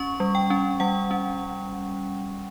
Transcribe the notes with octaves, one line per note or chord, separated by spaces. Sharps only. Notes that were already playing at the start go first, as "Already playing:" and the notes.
Already playing: C#4 C#6
G3
G5
C#4
G3 F#5
C#4